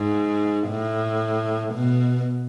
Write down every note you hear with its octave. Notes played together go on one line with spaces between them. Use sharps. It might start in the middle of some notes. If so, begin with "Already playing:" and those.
Already playing: G#2
A2
B2